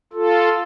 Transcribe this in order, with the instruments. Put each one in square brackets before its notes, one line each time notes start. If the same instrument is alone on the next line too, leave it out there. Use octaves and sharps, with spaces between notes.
[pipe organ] F4 A4